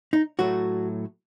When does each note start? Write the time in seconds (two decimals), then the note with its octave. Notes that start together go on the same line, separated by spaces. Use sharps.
0.13 D#4
0.39 A2 F#3 A3 F#4